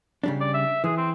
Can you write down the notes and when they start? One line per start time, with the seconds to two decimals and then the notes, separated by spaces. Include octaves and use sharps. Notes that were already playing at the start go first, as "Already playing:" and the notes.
0.24 C#3 G3 D4
0.41 D5
0.54 E5
0.84 E3 G#4
0.97 C4